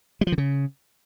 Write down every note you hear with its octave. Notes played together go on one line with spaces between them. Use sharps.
G3
F3
D3
C#3